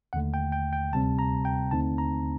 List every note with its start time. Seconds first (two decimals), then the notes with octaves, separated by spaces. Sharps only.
0.13 D#2 D3 A3 F#5
0.34 G5
0.52 G5
0.73 G5
0.92 D2 C3 G3 C4 A5
1.19 A#5
1.45 G5
1.71 D#2 D3 A3 C4 D#4 A5
1.98 A#5